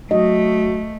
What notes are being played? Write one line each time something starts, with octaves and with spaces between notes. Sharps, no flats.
F#3 A3 D#5